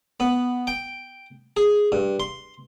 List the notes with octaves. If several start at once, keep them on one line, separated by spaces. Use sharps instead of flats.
B3
G5
G#4
G2
C6